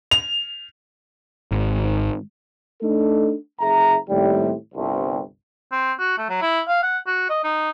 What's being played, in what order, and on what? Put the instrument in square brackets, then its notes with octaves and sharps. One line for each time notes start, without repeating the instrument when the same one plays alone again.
[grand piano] F7
[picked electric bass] G#1
[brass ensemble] A3 D4 D#4 A4
F#1 G#4 E5 A#5
D#2 A2 C3 G3
G1 C2
[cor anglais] C4
F#4
A3
F#3
E4
F5
F#5
F#4
D#5
D#4